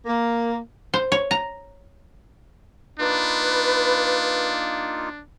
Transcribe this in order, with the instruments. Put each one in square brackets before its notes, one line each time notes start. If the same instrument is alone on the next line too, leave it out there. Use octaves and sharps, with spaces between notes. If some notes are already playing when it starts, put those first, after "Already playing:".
[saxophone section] A#3
[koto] C5
C#5
A#5
[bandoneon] A#3 D#4 F4 [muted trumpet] D4 [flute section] B4